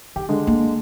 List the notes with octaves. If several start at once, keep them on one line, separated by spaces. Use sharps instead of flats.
D#3 G4
D3 G#3
A#3 D4